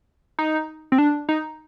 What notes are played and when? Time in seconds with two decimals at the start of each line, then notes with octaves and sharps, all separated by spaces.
0.39 D#4
0.92 C4
0.98 D4
1.29 D#4